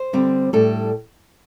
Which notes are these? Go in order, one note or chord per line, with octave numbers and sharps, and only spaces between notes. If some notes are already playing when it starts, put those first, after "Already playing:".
Already playing: C5
D3 G3 C4
A2 G3 D4 A4